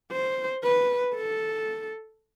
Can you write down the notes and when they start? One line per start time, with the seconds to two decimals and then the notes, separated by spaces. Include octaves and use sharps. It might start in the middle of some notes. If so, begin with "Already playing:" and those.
0.12 C5
0.64 B4
1.15 A4